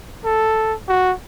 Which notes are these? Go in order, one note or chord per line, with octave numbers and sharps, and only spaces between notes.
A4
F#4